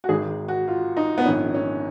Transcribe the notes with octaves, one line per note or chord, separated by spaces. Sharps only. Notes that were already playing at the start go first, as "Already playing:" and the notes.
F#4
G#1 G#2 D#3 G#4
F#4
F4
D#4
B3
A#1 G#2 D#3 C#4
C#4